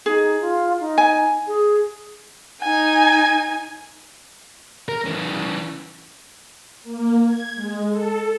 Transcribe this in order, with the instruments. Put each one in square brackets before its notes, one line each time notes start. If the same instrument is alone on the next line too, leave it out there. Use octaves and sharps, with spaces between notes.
[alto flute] D#4 [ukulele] G#4
[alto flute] F4
D#4
[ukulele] G#5
[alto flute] G#4
[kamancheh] D#4 G#5
[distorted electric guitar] A#4
C#3 E3
[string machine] A#3
G#6
G#3
A4